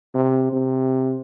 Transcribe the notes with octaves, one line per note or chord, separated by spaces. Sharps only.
C3
C3